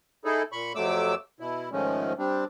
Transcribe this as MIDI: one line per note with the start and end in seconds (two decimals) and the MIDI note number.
0.25 0.43 63
0.25 0.43 64
0.25 0.43 68
0.25 0.43 69
0.52 0.73 46
0.52 0.73 83
0.52 0.73 85
0.75 1.15 41
0.75 1.15 48
0.75 1.15 54
0.75 1.15 57
0.75 1.15 86
0.75 1.15 88
1.40 1.69 47
1.40 1.69 64
1.72 2.13 44
1.72 2.13 51
1.72 2.13 53
1.72 2.13 56
1.72 2.13 57
1.72 2.13 61
2.18 2.44 55
2.18 2.44 60
2.18 2.44 62